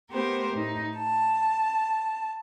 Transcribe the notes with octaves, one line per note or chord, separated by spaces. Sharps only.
A3 B3 G4 A#4 C5
A2 D#4
A5